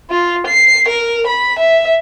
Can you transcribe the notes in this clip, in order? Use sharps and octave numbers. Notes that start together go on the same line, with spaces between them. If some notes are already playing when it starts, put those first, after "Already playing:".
F4
C7
A#4
B5
E5